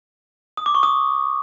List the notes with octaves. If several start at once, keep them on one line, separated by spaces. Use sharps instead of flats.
D#6
D6
C#6
D#6